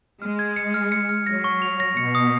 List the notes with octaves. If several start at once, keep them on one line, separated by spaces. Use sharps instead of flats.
G#3 F6
G#6
C#7
F6
C#7
F6
F#3 A#6
C#6
F7
A#6
B2 C#7
D#6